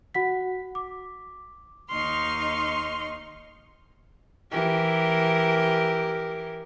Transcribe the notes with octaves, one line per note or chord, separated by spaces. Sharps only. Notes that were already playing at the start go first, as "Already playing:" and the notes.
F#4 F#5 B6
D6
D#2 D#4 C6 C#6 F6
E3 G4 A#4